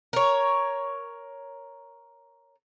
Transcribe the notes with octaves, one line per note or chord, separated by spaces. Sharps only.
A#4 C#5